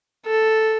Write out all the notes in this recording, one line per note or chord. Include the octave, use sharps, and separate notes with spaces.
A4